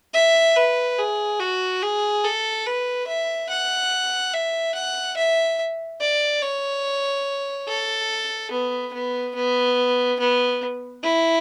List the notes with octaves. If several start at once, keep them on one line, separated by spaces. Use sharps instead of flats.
E5
B4
G#4
F#4
G#4
A4
B4
E5
F#5
E5
F#5
E5
D5
C#5
A4
B3
B3
B3
B3
E4